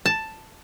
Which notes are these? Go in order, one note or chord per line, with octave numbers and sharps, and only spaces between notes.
A5